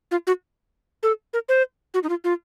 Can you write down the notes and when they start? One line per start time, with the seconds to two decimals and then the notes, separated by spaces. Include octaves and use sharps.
0.11 F4
0.27 F#4
1.03 A4
1.33 A#4
1.49 C5
1.94 F#4
2.03 D#4
2.09 F4
2.24 F4